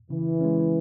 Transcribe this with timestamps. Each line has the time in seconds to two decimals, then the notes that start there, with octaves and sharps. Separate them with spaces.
0.10 C#3 E3
0.41 G#3 C#4